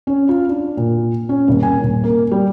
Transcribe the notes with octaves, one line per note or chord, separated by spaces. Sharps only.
C#4
F4
D4
A#2
C#4
D#1
G#5
D#1
A#3
G3